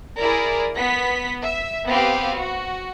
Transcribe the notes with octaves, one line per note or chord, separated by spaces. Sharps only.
E4 G#4 A#4 D5
B3 F#5 B6
E5
B3 C4 G4 B4 F5
F#4